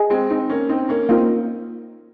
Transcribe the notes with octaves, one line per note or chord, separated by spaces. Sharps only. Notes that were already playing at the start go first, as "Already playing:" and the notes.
Already playing: G#4 D#5 G#5
G#3 C4
C4 D#4
A#3 C#4
C4 D#4
A#3 C#4
A#3 C4 D#4 F4 A#4